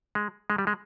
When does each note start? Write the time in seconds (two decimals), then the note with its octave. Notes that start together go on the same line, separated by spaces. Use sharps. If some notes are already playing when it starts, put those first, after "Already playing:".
0.15 G#3
0.50 G#3
0.58 G3
0.67 G#3